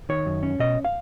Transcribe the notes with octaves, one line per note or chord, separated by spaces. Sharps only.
D#3 C#5
F#2
C#4
B2 D#5
F5